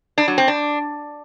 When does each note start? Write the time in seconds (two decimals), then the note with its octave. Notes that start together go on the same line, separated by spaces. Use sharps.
0.18 D4
0.28 F#3
0.38 C4
0.48 D4